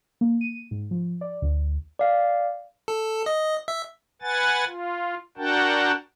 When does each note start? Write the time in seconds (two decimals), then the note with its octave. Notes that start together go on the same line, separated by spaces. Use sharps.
0.21 A#3
0.41 D#7
0.71 G#2
0.91 F3
1.21 D5
1.42 D2
1.99 D5 F5
2.88 A4
3.26 D#5
3.68 E5
4.22 B4 F#5 G#5 A6
4.66 F4
5.37 D4 F#4 A#4 F#5 G5 A5